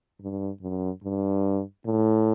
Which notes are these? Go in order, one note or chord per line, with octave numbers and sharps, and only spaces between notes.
G2
F#2
G2
A2